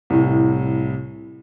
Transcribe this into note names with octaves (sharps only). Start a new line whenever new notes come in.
C2 A2